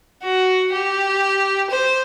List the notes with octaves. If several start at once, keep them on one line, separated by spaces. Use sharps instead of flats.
F#4
G4
C5